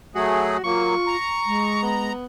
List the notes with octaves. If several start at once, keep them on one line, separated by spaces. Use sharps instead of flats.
F#3 A3 F#4 G#4
F#3 A#3 F4 C#6
A#5
G#3
B3